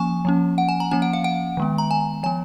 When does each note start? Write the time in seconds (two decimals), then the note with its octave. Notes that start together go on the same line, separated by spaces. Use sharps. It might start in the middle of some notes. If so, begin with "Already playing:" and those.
Already playing: F3 A#3 C#4 G#5 C#6
0.25 F3 A#3 C#4
0.58 F#5
0.69 G#5
0.80 A#5
0.91 F3 A#3 C#4 G#5
1.02 F#5
1.13 F5
1.24 F#5
1.57 D#3 G#3 B3
1.78 A#5
1.91 G#5
2.23 F3 B3 G#5